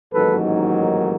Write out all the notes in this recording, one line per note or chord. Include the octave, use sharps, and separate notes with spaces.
A1 G#2 D#3 F#3 A#3 A4 B4